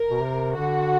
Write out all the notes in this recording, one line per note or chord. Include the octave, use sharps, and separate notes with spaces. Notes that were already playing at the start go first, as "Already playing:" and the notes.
Already playing: A#4
B2
C3
D3 F#4